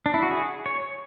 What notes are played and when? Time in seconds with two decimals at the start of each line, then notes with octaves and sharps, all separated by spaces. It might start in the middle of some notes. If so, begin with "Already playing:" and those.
0.06 D4
0.14 E4
0.23 F#4
0.31 G#4
0.66 C#5